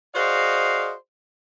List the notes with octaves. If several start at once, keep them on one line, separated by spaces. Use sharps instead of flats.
F#4 G#4 C5 D5 D#5 F5